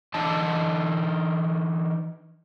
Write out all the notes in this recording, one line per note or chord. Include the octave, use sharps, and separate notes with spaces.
E3 D4 D#4 A5